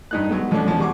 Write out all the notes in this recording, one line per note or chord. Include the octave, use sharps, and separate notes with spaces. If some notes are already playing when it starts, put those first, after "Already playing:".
G2 D#4 F#6
F#3 G#3 B3
B2 F3 A3 C#4 D4
B2 F3 C#4
E2 G3 G#3 F#4 C#6 D6